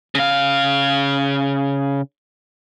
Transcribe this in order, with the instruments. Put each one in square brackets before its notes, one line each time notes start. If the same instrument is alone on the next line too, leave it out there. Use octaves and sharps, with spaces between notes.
[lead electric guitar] C#3 F5